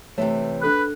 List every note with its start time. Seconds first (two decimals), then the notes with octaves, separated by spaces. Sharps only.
0.18 C3 E3 A3 C#5
0.62 D4 A4 B4 F#6